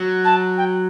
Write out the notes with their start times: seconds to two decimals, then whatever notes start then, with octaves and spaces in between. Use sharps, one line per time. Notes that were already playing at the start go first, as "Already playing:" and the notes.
Already playing: F#3
0.24 A5
0.57 G5